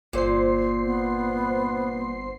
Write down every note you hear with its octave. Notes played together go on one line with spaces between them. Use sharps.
G1 A#2 C5 C7
B3